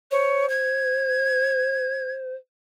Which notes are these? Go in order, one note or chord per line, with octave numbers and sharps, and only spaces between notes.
C5 C#5
G#6